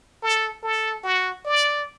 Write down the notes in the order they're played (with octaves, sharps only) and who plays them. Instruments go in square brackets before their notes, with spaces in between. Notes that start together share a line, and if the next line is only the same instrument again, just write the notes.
[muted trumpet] A4
A4
F#4
D5